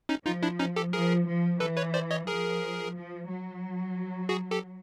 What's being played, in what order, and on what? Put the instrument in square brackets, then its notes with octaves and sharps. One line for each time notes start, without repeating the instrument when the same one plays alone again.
[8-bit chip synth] C#4 D#4
[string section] F3 [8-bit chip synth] D#4 F4
[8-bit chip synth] D4 E4
C#4 D#4
G4 A4
[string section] F3 [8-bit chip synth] G#4 A#4
[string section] F3
[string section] E3 [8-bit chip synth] A4 B4
[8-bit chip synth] B4 C#5
C5 D5
C#5 D#5
[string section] F3 [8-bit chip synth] G#4 A#4
[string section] F3
F#3
[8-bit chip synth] F#4 G#4
G4 A4